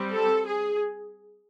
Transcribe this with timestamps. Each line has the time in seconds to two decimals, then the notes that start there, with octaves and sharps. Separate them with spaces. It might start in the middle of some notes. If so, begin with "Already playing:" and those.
Already playing: G3 C4
0.12 A4
0.46 G#4